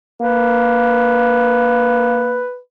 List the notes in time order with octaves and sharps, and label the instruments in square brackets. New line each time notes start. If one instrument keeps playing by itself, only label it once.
[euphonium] A#3 [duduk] B4